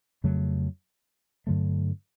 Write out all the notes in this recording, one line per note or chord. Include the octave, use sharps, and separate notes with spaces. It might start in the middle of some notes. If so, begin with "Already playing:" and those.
F2 C#3 F#3 A3
G2 D3 F#3 A3